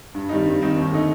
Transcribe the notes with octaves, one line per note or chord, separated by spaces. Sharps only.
G2
D#3 G3 C4 D#4
G2
D#3 G3 C4 D#4
D#2
D3 A3 D#4